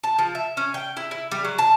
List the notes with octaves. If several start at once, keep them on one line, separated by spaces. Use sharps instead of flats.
A5
F3
E5
C#4
G5
E4
E4
G3
F#3
A5